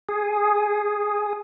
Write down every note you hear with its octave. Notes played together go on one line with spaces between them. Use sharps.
G#4